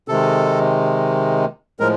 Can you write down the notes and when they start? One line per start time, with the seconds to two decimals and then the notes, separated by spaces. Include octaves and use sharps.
0.08 C3 D#3 G#3 A4
1.80 A2 F3 G#3 A#4